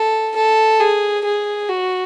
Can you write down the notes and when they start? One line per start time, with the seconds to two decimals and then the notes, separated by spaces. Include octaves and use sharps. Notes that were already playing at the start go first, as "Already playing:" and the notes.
Already playing: A4
0.36 A4
0.80 G#4
1.25 G#4
1.69 F#4